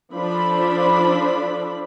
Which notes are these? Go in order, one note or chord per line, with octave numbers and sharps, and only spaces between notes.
F3 D4 A4 B5